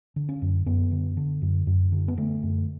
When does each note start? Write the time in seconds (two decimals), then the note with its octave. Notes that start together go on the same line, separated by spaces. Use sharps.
0.16 D3
0.29 C#4
0.42 F#2
0.66 F#2 B3
0.92 D3
1.17 D3
1.42 F#2
1.67 F#2
1.92 D3
2.08 B3
2.17 D3 A3
2.43 F#2